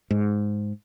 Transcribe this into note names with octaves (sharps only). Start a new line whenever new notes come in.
G#2